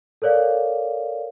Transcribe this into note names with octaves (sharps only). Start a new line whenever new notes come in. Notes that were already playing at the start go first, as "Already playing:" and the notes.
A4 A#4 C#5 D5 F5